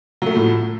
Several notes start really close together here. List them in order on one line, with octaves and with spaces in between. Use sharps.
F#3 A3 F3 A2